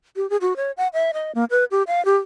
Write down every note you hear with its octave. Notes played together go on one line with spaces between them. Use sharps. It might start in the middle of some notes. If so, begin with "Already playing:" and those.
G4
G#4
F#4
C#5
F#5
E5
D#5
A#3
B4
G4
F5
G4